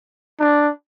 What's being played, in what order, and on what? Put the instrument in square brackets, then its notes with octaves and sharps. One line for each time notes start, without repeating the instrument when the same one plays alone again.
[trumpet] D4